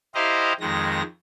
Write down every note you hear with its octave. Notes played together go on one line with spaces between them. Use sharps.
E4 G4 C5 D#5 F5 A#5
F2 D#3 G#3 A#6